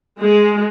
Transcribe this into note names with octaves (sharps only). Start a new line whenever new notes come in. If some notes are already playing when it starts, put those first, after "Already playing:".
G#3